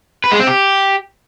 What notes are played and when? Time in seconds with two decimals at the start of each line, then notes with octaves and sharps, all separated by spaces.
0.24 B4
0.32 G#3
0.39 C4
0.47 G4